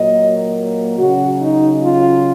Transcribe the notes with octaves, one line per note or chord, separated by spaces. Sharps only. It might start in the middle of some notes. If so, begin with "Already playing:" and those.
Already playing: A#2 F#3 A#3 D#5
C#3 F#3 C#4 F#4
D#4
F4